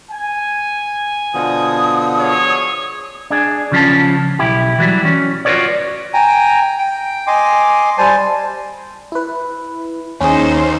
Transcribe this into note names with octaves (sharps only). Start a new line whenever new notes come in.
G#5
B2 D3 F3 D#6
G#4 C#5
D4 G#4
C#3 F3 C#4 A5
B1 E4 G4
E3 F#3 G3
C#4
F4 F#4 A4 B4 C#5 D5
G5 G#5 A#5
G5
D#5 G#5 C6 D6
G3 C5 G#5 A5
E4 B4
D#2 C#4 D#4 G#4 C5